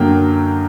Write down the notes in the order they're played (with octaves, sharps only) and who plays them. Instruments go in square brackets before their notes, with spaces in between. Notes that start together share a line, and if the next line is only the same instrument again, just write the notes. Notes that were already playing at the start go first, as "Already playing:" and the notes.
Already playing: [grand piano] F#2 D3 F#3 A#3 G5